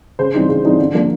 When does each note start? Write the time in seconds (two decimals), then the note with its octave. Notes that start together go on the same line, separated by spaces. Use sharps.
0.19 C#3 C5
0.34 E3 G3 C4 D#4
0.49 C#3
0.64 E3 G3 C4 D#4
0.80 D3
0.94 F3 A#3 D4